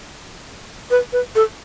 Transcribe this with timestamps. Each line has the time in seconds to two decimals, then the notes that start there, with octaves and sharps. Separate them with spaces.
0.91 B4
1.13 B4
1.35 A4